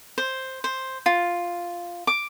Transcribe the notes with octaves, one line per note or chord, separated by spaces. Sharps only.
C5
C5
F4
D6